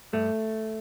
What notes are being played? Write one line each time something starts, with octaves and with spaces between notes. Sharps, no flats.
G2 A3